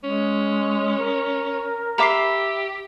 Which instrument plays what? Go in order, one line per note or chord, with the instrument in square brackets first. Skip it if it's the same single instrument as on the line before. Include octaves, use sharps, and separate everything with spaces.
[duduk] G#3 [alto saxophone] C#4
[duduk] A#4
[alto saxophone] G4 [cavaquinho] E5 B5 [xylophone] A#5 D6 C7